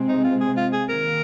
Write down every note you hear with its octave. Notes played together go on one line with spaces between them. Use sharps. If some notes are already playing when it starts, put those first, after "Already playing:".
Already playing: C3 G#3 C4
D#4
F4
G#4
F4
G#4
D#3 A#3 A#4